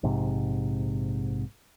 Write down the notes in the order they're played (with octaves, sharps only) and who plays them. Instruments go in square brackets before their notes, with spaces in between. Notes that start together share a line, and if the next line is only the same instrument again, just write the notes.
[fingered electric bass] A#1 G#2 C3